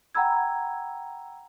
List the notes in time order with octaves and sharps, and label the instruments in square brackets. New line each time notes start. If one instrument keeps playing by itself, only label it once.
[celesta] F#5 G5 A#5 B5 E6 G#6